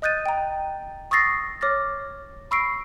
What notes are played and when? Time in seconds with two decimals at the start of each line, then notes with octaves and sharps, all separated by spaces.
0.02 D#5 D#6 F#6 G6 A6 D#7
0.26 G5 A#5
1.11 C#6 D#6 E6 A6 A#6 C7
1.61 C#5 D6 F6 A6 A#6
2.51 B5 C#6 E6 A#6 C7 D7